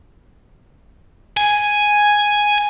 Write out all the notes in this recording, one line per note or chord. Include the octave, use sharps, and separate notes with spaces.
G#5